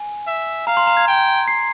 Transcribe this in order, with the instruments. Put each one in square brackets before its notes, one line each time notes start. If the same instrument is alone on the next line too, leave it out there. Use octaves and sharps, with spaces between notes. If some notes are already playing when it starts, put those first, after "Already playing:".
Already playing: [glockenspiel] G#5
[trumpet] E5
[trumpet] F5 [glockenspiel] A#5
[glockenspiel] C6
A#5
G#6
[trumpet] G5
[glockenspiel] C7